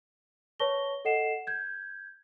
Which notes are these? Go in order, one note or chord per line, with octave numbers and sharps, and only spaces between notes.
B4 C#5 A5 C#6 A#6 G7
A4 D#5 F#5 C7 E7
G6 G#6